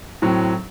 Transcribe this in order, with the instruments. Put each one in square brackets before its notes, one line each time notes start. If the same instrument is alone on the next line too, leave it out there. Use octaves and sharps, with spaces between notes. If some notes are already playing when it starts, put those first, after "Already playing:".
[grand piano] A2 F#3 C4